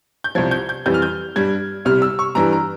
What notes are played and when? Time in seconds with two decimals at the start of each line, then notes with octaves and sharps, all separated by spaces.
0.24 G6
0.35 C2 C3 F3 G#6
0.51 G6
0.69 G6
0.86 F2 E3 G3 G6
0.94 F6
1.02 G6
1.36 G2 G3 G#6
1.85 C2 C3 G3 F6
2.02 E6
2.19 C#6
2.35 G2 E3 G3 A#5
2.53 A#5